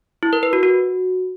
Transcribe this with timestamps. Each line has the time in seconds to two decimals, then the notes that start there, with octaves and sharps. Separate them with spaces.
0.23 E4
0.33 A#4
0.43 B4
0.53 F#4
0.63 F#4